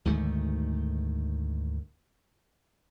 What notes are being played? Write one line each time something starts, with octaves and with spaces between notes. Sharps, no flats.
D2 G#2 D#3 A3